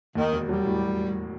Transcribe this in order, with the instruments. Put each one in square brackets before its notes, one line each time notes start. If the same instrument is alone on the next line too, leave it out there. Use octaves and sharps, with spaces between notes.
[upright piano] D#2 [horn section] D#3
[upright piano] E1
[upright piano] F#3 [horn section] G3
[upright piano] A2